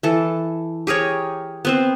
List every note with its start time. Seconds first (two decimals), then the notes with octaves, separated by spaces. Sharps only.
0.03 E3 A4
0.87 G4 G#4 A#4 C#5
1.65 B3 C4 C5